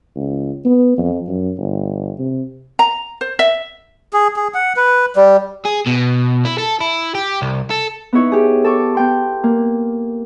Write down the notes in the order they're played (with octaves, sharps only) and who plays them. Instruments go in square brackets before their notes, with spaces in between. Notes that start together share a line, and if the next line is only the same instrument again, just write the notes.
[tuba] C#2
B3
F2
F#2
G1
C3
[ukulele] A#5
C5
E5
[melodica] G#4
G#4
F#5
B4
G3
[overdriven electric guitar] G#4
B2
E4
A4
E4
G4
C2
A4
[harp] B3 D#4 E4 C#5
G4 G#4
A4 A5 C#6 D6
B3 G5 C6
A#3